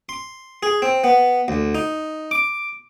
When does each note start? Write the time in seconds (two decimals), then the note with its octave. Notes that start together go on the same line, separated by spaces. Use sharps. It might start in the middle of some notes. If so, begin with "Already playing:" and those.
0.09 C6
0.63 G#4
0.82 C4
1.04 B3
1.48 D2
1.75 D#4
2.31 D6